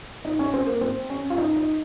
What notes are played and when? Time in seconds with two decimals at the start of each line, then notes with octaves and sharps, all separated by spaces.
0.25 D#4
0.39 C#4
0.54 C4
0.66 A#3
0.81 C4
1.10 C#4
1.30 F4
1.38 D#4
1.56 D#4